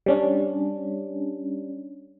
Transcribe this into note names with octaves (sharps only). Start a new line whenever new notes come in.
G3 C#4 D4